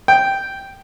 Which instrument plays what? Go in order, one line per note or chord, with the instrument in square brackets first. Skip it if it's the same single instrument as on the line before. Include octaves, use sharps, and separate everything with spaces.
[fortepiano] G5